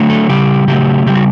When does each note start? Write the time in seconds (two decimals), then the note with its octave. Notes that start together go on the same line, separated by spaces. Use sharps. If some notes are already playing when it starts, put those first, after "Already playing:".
Already playing: D3 F#3 A3
0.10 A4
0.29 C#3 G3 G4
0.68 C#3 F#3 A3 G4
1.06 C#3 G3 G4
1.15 F#4